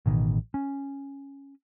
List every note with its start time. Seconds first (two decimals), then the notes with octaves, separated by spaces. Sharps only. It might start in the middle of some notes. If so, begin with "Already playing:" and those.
0.06 A1 B2 D#3
0.54 C#4